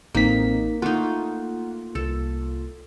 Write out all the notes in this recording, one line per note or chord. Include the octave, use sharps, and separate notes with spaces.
A1 A#3 C4 D#4 B6
A3 A#3 D#4 F4 F#5
C2 A4